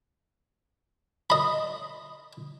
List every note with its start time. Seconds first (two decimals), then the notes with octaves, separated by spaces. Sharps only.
1.30 D#5 B5